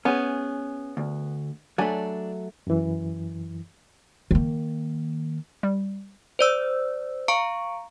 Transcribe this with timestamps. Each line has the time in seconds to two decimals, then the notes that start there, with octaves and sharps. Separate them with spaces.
0.05 B3 C#4 G#4
0.97 D2
1.78 F#3 A3 D4 D5 G#5
2.67 F#2 E3
4.31 D#3 A#3
5.63 G3
6.39 C5 D5 E6
7.28 F5 A#5 C#6 C#7 D7